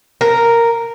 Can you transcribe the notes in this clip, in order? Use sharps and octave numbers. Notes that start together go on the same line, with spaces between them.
A#4